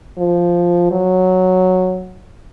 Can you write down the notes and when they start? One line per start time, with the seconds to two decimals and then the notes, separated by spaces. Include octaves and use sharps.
0.18 F3
0.91 F#3